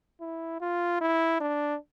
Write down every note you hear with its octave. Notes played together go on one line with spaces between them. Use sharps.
E4
F4
E4
D4